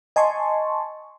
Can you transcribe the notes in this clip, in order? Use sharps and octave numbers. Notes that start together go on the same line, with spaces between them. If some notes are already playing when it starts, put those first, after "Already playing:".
D#5 G#5 A5 C6 C#6